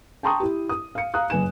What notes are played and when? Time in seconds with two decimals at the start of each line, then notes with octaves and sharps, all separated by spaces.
0.23 G5 A5 A#5 C6 C#6 D#6
0.40 E4 G4
0.69 D#6
0.95 F5 C#7
1.14 F5 A#5 D#6 F#6
1.30 F#1 B4 G#5 E7